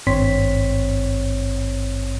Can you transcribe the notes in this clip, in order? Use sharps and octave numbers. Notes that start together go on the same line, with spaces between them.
G#1 G2 C4 C#5 C6 B6